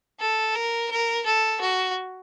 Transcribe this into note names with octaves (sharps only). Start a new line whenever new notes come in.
A4
A#4
A#4
A4
F#4